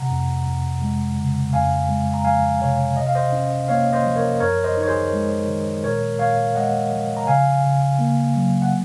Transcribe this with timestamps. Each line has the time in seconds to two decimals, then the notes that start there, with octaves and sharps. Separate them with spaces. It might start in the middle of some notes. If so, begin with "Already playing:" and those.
Already playing: C3 F#5 A#5
0.10 F2
0.45 F2
0.82 G#3
1.18 C#3
1.53 F2 F5 G#5
1.89 G#3
2.14 A#5
2.25 F3 F5 G#5
2.61 C3 C#5 F5
2.97 C3 D#5
3.07 F5
3.15 C5 D#5
3.32 C#4
3.68 A#3 C#5 F5
3.93 C5 D#5
4.05 F3
4.16 A#4 C#5
4.40 F#2 A#4 C#5
4.64 C5 D#5
4.77 D#4
4.82 C#5
4.88 G#4 C5
5.13 G#3
5.48 D#3
5.84 A#2 A#4 C#5
6.19 A#2 C#5 F5
6.55 G#3 D#5 F#5
6.92 F3
7.17 A#5
7.27 C#3 F5 G#5
7.63 C#3
7.99 A#3
8.36 F#3
8.62 F#5